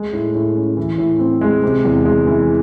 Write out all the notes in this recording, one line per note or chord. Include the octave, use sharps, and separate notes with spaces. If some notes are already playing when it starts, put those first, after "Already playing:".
Already playing: G#3
A2
A2
C#4
E3
A2
C4
G#3
C3
E2
G#3
E3